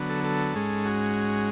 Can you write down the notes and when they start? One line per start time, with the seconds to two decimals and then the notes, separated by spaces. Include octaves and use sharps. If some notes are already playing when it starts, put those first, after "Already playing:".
Already playing: D3 F#3 B3
0.09 A4
0.24 A4
0.55 G#2 G#3 C#4
0.85 F#4